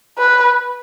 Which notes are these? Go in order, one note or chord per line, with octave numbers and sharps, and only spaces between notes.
B4